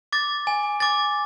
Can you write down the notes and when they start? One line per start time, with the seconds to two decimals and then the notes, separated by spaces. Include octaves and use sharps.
0.13 D6 A6
0.47 G#5
0.80 D6 A6